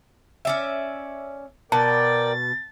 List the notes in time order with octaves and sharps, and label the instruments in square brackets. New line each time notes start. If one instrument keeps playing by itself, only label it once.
[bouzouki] C#4 D5 E5
[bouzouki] B2 [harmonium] A#4 D5 G5 [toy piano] A5 [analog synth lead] A6